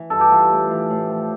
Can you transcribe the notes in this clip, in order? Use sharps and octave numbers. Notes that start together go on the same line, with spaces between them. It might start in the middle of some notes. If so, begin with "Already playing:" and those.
Already playing: E3
G2 A4
G4
E3 F4
A2
E3
A2
F3